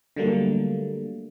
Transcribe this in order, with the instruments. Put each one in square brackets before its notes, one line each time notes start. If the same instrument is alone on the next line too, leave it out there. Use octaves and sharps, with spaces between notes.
[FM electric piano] D3 F#3 G3 A3 A#3